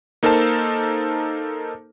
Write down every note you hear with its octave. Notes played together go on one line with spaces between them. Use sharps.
A#3 D#4 A4 A#4 C5 A5